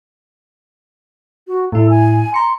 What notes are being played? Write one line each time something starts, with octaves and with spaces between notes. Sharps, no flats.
F#4
A2 E4 A4
G#5
A#5 C6 C#7